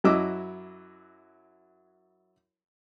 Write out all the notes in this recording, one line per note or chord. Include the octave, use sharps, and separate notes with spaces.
F#2 F#3 E4 D#5 D6 E6